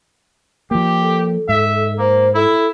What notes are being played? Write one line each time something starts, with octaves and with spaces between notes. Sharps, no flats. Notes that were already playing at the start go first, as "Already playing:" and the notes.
F3 A#3 G4
A4
G#2 E5
A#3 C5
E4 A4